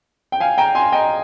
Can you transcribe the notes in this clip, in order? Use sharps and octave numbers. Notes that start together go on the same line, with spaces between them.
G5
F5 G#5
G5 A#5
G#5 C6
D#5 G5